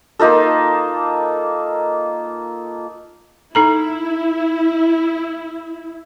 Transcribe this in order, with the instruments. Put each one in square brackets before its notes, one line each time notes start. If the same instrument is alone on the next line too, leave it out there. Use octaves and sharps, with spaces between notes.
[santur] A#3 D#4 F4 A4
[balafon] D#4 A4 A#5 [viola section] E4